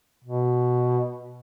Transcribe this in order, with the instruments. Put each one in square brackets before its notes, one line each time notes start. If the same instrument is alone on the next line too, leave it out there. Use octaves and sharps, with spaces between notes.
[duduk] B2